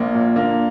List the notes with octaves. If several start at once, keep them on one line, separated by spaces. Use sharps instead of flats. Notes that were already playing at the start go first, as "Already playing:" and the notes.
Already playing: A#1 A#3
A#2
D3 A#3